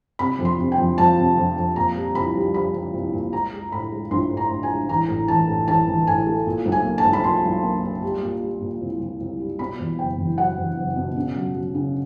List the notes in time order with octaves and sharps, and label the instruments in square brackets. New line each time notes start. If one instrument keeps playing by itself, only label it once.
[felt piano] C3 B5
F2
C6
C3
G5
F2
F3 A5
C3
F2
F2
A#2 A#5
G3
C2 B5
G3
G3 B5
G3
C2
A#2
G#3 A#5
G#3
A2 B5
G#3
A#1 C6
A2
A#5
A2
G#5
G#3
A1 A#5
A2
E3 A5
A2
A1 A5
E3
A2 G#5
A3
A#2
B1
G#5
A#3
A5
B1
B5
A#2 C6
B1
A#3
A#3
G3
A#2
G3
A#2
C2
C2
C2
G3
B2 B5
E2
F#1 G5
E2
F#3 F#5
E2
F#1
B2
C#3
F#3
F#3
C#3